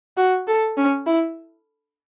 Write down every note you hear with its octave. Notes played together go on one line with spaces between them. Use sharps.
F#4
A4
C#4
E4